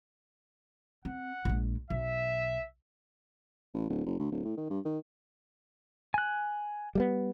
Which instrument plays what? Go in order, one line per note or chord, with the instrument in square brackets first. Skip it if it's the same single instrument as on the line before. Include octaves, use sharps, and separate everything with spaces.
[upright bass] C4 [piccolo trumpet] F#5
[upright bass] A#1 G#3
[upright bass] B1 [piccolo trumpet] E5
[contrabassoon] A1
D1
F#1
D2
D1
A2
D#3
G2
D#3
[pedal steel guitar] G#5 F#6
[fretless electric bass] G3 A3 B3